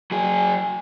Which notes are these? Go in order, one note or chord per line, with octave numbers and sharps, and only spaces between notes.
F#3 G#4